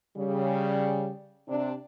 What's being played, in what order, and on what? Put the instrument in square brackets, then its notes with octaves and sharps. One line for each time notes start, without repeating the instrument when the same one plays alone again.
[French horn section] C#3 G3
C3 D4